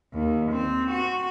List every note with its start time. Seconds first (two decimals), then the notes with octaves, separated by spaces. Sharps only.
0.13 D#2
0.52 C4
0.91 F#4